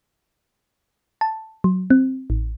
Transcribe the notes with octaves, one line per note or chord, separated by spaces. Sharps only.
A5
F#3
C4
A1